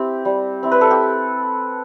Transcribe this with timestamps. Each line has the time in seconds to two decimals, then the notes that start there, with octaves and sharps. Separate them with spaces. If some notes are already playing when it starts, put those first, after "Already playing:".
Already playing: C4 E4 G4
0.25 G3
0.63 C4 E4
0.72 B4
0.81 A4
0.91 G4